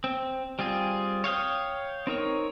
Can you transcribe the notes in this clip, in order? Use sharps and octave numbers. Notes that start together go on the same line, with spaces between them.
C4
G3 C4 F4 G#4
C#5 F5 G5 D#6
C4 D#4 A#4 C#5